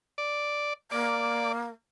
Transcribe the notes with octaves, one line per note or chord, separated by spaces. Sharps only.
D5
A#3 D5